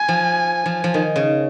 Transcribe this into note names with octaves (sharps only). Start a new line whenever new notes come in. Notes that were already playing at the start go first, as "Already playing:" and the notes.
Already playing: G#5
F3
F3
F3
D#3
C#3